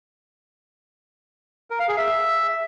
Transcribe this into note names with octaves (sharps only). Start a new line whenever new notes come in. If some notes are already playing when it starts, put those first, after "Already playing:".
A#4
F5
G#4
E5